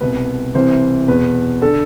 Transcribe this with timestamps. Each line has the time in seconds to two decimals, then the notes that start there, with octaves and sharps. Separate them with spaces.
0.01 C2 B2 B4
0.54 C2 C3 E3 C5
1.07 E2 B2 B4
1.62 D3 A4